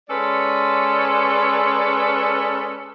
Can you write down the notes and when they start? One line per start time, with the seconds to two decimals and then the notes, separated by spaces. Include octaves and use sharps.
0.08 G#3 C#4 A4 B4 D5